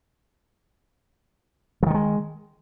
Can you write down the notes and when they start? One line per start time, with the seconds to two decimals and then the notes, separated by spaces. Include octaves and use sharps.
1.83 F3
1.87 D#3
1.90 G3
1.94 G#3